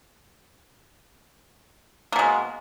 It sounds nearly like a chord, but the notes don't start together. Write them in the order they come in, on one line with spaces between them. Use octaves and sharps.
A#3 B2 G#3